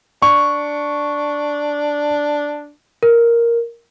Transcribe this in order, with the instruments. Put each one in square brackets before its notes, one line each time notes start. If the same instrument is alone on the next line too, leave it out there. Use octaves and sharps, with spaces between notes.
[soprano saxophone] D4 [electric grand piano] C#6
[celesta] A#4